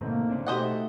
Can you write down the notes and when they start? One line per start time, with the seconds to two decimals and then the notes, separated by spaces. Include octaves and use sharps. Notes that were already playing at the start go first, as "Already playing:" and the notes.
0.01 G#2 B2 D3 A3 A#3 C4 D#4
0.30 C#3 C4 D4
0.47 B2 A3 D#4 F#4 G4 C5 D#5 F#5